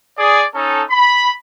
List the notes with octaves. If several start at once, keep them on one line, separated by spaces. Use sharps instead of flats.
G#4 D5
C#4 D#4 A4
B5